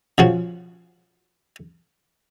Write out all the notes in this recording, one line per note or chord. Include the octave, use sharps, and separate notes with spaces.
C#3 F3 F#4